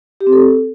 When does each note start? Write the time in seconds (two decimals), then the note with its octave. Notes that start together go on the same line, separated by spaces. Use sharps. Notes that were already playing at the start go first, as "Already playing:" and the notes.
0.21 G4
0.27 C4
0.33 A4